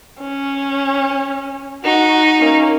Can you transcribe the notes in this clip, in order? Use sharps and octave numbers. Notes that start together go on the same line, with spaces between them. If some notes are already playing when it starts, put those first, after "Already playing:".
C#4
D#4 F#4
A#3 C#4